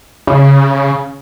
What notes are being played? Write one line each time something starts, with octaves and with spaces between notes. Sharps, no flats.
C#3